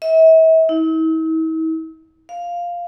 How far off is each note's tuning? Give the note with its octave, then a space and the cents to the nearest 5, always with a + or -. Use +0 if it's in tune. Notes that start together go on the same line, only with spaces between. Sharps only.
E5 -40
E4 -45
F5 +0